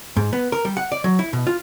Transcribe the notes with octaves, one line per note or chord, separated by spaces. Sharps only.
G#2
B3
A#4
G3
F#5
D5
F#3
E4
B2
F4